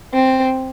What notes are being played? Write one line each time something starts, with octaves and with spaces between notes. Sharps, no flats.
C4